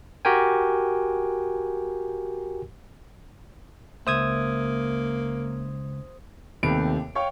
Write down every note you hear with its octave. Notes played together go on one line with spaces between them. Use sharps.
F#4 G4 A#4 G5 G#5
C#2 A#3 C5 E5 D#6 G#6
D#2 C3 A3 B3 B5 D7
C#5 F5 G5 C#6